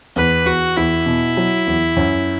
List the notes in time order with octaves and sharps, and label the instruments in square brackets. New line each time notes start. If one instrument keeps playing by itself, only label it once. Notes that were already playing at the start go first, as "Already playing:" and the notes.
[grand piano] E2 [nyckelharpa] B4
[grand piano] E2 [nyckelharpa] F#4
[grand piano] E2 [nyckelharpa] E4
[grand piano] B2
F#3
E2
F#2